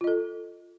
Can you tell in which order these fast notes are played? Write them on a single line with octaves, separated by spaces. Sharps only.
F4 D#5 A4